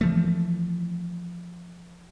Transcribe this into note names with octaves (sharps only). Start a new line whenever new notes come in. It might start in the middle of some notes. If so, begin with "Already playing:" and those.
E3 F3 A3